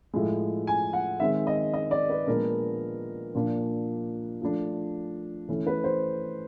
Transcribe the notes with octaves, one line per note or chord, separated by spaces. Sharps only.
A2 F3 G#3
G#5
F#5
D#3 G#3 C4 E5
D#5
D#5
D5
B4
A#2 F3 G#3 B3 D4 A#4
A#2 F3 A#3 D4
F3 A3 D4
E3 A3 C#4
B4
C5